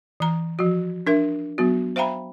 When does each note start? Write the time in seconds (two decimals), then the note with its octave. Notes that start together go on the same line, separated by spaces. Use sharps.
0.20 E3 A#5
0.59 F3 F#4
1.07 D4 A#4 E5
1.58 F#3 B3 F#4
1.96 C5 E5 F5 G5 A#5 B5